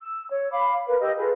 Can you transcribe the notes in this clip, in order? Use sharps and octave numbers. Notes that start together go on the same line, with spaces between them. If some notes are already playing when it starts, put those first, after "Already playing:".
E6
C#5
F5 B5 D6
A#4 B4
G4 D#5 E6
F4 G#4 A4 B4